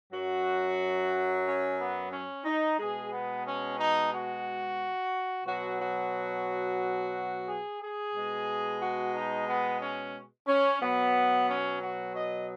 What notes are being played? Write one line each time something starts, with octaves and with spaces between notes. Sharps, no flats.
F#2 F#3 F#4
C#4
B3
C#4
D#4
B2 G#3 G#4
B3
C#4
D#4
F#4
B2 F#3 F#4
F#4
G#4
G#4
B2 G#3
F#4
D#4
B3
C#4
C#4
B2 F#3 B3
C#4
F#4
D#5